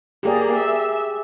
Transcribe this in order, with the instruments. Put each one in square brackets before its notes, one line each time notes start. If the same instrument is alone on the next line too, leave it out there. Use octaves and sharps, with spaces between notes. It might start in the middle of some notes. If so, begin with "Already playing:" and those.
[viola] A#3 [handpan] G4 G#4 D5
[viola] E5